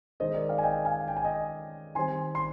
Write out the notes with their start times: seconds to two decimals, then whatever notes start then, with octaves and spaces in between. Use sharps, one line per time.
0.20 D#3 G#3 D#4 C5 D#5
0.34 A#4 D5
0.49 D5 F5
0.58 G#5
0.63 D#5 G5
0.85 F5 G#5
1.08 G5
1.17 G#5
1.24 D#5 G5
1.95 D#3 G3 C4 G#5 C6
2.35 C6